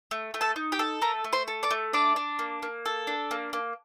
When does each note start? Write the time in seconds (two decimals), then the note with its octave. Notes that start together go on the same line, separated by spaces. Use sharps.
0.11 A3
0.34 A3
0.41 A4 A5
0.56 D#4
0.72 G4 G5
0.79 A4
1.01 A3 A#4 A#5
1.24 A3
1.33 C5 C6
1.48 A4
1.63 D5 D6
1.71 A3
1.93 D4 D5 D6
2.16 D4
2.39 A#3
2.63 A#3
2.86 A4
3.07 D4
3.31 A#3
3.53 A#3